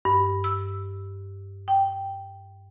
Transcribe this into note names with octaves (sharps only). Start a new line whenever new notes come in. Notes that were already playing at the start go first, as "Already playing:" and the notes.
G2
E6
G5